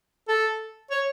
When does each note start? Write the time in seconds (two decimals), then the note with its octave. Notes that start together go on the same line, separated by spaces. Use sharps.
0.28 A4
0.91 C#5